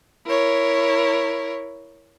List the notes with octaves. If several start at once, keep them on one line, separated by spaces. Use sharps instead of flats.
E4 A#4 C#5